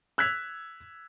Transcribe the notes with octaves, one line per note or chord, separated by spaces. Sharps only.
E6 F#6 G#6 B6 F7